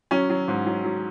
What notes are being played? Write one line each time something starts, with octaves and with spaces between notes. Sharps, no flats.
F#3 C#4
F#3
G#2
F#3
F#3